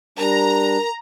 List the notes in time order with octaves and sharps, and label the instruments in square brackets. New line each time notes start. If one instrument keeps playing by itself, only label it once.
[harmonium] G3 D4 [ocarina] A#4 [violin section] A#5